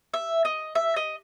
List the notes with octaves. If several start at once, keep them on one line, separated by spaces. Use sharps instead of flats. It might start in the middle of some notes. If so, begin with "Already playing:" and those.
E5
D#5
E5
D#5